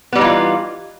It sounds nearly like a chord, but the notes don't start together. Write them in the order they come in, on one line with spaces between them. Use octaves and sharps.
B3 G3 D#4 E3 F4